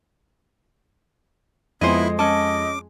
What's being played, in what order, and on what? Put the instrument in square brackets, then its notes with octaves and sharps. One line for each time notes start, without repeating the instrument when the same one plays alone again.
[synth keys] F2 G#3 [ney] B3 [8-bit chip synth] E4 [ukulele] C5 D#5
[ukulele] C#4 A5 [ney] D#5 [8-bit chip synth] D6